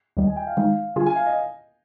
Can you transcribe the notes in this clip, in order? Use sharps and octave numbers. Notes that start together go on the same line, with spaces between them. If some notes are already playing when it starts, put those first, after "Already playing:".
D#2 D#3 G3 D#5
G#5
G5
F5
D#3 G#3 D#4 F5
D3 G3 D4 F4 G#4 G#5
G#5
F5
D#5